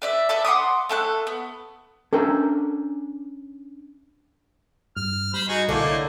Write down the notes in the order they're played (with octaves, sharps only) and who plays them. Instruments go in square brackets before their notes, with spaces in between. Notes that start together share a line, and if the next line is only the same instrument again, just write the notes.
[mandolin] B4 D5 E5
A4 B4 D5 E5
F#5 C6 D6 D#6
A3 A4 F#5 F#6
B3
[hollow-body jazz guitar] C#4 D4 G5 [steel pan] A4 A#4
[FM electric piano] G2 [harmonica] F6
[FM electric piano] G3 [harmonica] C5 B5
[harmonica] D#4 F#4 G#4
[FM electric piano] B1 E4 [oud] D3 [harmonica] A3 A#3 D#4
[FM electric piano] A#4 C#5 D5